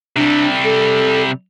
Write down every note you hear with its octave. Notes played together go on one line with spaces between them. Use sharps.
C3 G3 D4
A4